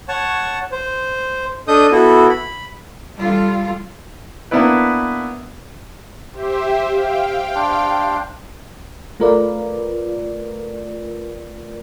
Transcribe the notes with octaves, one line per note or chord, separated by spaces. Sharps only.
C#5 F#5 A5 C#6
C5
D4 A4 D#5 D#6 G6
B3 E4 F#4 A4
B5
G3 F4 A4
A#3 B3 D4 E4 B4
G4 C5 E5
F5 G5
D4 C5
A3 F4 A#4 B4 D5